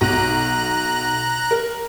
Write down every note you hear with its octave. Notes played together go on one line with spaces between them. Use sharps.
B1 F#4 A#5 F#6 A#6
A#4